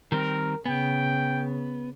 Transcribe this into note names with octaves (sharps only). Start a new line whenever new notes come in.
D#3 G3 C4 A#4
C#3 B3 G5